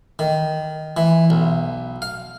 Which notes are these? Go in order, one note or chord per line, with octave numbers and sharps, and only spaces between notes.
D#3
E3
B1
F5